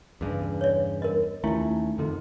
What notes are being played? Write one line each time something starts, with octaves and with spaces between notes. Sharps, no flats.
E2 G2 C#3
C#5 D5
A#4 D#5
D#2 A3 C#4 E4 F4
F2 D3 D#3